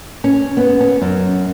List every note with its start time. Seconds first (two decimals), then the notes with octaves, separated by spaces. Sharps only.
0.24 C#4
0.57 B3
0.81 C#4
1.01 F#2